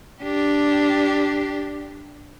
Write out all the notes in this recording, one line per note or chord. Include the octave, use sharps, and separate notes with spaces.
D4 G4